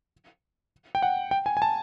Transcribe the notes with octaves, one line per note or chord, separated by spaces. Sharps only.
G5
F#5
G5
G#5
G#5
A5